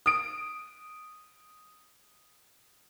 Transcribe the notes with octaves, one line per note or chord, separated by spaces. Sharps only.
D#6 D7